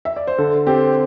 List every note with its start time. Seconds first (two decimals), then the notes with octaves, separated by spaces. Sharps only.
0.05 E5
0.16 D5
0.27 C5
0.38 D3 A4
0.67 C4 G4 A4 C5